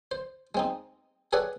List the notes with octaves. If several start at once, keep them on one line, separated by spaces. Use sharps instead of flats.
C5
G#3 C4 D#4
G#4 A4 B4 C#5 D5 F#5